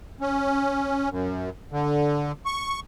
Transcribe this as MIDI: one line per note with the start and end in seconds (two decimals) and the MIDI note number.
0.21 1.09 61
1.10 1.50 42
1.72 2.32 50
2.46 2.80 85